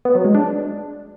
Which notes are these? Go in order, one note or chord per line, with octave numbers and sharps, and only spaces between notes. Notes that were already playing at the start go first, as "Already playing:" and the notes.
B3
F#3
G#3
D4